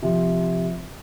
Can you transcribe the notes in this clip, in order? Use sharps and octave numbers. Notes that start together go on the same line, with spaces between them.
C3 F3